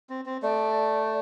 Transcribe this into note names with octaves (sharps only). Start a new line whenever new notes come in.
C4
C4
A3 D5